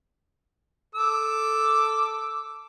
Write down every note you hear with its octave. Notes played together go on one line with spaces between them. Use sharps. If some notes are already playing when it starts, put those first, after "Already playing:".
A4 D6 E6